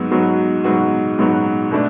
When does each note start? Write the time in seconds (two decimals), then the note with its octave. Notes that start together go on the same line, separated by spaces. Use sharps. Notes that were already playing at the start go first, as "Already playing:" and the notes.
Already playing: G#2 F#3 B3 F#4
0.11 G#2 F#3 B3 F#4
0.64 G#2 F#3 B3 F#4
1.19 G#2 F#3 B3 F#4
1.71 B2 A3 D4